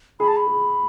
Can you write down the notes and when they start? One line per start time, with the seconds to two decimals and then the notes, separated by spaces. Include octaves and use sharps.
0.20 G#4 B5
0.28 A5
0.36 B5
0.47 G#4